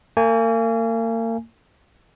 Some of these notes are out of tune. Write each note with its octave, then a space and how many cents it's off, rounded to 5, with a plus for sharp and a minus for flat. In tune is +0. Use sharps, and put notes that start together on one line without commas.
A#3 -40 G#5 +0